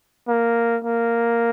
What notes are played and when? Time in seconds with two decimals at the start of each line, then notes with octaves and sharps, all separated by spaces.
0.28 A#3
0.84 A#3